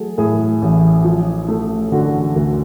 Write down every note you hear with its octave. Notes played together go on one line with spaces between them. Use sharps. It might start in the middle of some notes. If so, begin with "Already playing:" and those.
Already playing: F#3 A3 G#4 A4
A2 G#4
A1
F3
A3
D3 F#4
D2